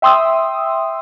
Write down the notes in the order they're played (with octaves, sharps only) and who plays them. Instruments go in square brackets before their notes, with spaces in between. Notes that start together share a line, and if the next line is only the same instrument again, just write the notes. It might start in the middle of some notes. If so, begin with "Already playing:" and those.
[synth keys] E5 G5 C6 D#6 E6